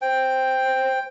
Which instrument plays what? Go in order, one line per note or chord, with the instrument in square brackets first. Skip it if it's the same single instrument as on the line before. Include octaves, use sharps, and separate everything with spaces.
[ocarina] C5 [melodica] G5